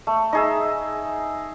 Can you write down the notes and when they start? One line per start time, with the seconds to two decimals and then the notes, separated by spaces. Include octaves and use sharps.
0.07 A3
0.33 D#4 G#4 E5